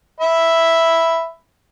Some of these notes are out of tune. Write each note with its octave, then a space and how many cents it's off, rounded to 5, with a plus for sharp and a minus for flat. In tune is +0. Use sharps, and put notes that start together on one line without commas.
E5 +0 B5 +0